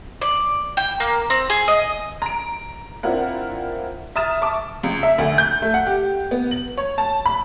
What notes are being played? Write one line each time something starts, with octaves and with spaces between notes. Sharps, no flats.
D5
G5
A#3
C4
G#4
D#5
A#5 D7
C4 D4 E4 F4 A#4 F#5
E5 A#5 D#6 F6 A6 E7
E5 A5 C#6 D6
C#2
E5
D2
G6
A3
F#5
G4
B3
F#7
C#5
A5
B5